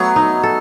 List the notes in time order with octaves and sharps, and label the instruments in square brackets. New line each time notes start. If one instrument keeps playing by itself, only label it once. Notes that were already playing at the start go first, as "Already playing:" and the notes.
Already playing: [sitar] F#3 [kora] A3 B3
[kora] D#4
A4